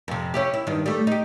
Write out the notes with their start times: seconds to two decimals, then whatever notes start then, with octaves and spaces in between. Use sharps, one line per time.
0.08 F2 C3
0.34 C#4 E4 G4
0.54 E4
0.67 G2 D#3
0.86 G3 A3
1.07 D#4 G4